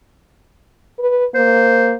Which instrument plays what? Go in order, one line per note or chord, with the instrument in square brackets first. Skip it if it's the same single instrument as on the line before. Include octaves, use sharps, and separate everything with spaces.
[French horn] B4
[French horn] A#3 [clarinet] C5